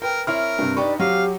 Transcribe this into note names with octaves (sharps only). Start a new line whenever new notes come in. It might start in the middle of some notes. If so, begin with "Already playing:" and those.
A#4 B4 G5
C4 E4 A#4 C#5 F6
G2 C3
D4 D#4 G4 B4 D5 C#6
F#3 C4 G4 F5